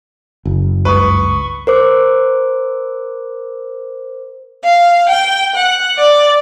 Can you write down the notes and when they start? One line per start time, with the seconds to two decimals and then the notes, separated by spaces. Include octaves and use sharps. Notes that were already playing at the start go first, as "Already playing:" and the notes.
0.45 F#1
0.85 C#2 G2 B4 C#6 D#6
1.67 A#4 C5 D6
4.63 F5
5.09 G5
5.53 F#5
5.98 D5